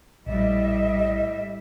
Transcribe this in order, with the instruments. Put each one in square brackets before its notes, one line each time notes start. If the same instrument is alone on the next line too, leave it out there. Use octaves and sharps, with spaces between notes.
[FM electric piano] A#1 [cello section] A2 G3 E5 [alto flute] D#5